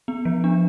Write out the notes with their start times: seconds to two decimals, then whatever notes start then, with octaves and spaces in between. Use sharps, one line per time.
0.08 B3
0.25 F3
0.44 D4